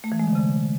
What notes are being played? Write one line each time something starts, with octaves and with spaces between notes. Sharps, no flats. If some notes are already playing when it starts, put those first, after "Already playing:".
A3
E3
G#3
D3
C3